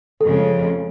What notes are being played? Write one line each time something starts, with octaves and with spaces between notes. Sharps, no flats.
F2 C#3 G#3 A4